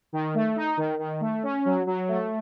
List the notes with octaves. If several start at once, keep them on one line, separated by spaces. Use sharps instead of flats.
D#3
A3
D#4
D#3
D#3
A3
C#4
F#3
F#3
A3